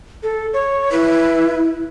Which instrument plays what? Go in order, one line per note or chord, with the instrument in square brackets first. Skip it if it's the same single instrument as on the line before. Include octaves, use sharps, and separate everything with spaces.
[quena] A4
C#5
[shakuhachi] E4 [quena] B4